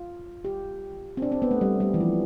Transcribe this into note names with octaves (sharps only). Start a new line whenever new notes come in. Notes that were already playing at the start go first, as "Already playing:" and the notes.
Already playing: F4
G4
C4
D4
C4
B3
A3
G3
G3
E3
F3